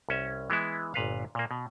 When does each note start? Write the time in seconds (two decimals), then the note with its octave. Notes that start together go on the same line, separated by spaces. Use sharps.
0.09 C2 C#4 E5
0.50 E3 G#3 B3 E4
0.94 G1 A#2 B4 F5
1.35 A#2 A#3
1.51 B2